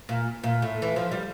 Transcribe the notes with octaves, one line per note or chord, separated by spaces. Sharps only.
A#2
A#2
A2
E3
F3
G3